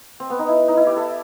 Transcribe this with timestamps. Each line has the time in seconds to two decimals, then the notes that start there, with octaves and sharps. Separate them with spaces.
0.20 C4
0.30 B3
0.39 D#4
0.48 E4
0.68 D#4
0.77 E4
0.87 G4
0.96 A4